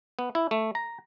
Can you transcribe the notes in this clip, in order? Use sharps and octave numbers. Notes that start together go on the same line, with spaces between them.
B3
E4
A3
A#5